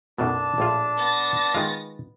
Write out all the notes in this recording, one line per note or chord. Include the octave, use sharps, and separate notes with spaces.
B1 F#2 B2 D4 A5
A#1 A2 F4
B3 A6 A#6
D#3 G#3 F4